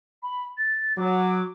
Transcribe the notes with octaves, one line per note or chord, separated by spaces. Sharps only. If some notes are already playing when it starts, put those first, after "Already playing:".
B5
A6
F#3 D6